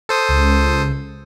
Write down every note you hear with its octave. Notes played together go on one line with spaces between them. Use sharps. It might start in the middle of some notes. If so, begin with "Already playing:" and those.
A4 C5 D#6
C#2